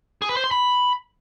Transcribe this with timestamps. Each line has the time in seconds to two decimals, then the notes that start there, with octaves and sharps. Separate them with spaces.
0.22 G#4
0.29 B4
0.36 C5
0.44 C6
0.51 B5